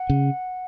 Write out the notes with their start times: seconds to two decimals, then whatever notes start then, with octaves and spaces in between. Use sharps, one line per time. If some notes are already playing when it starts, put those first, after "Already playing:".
Already playing: F#5
0.09 C#3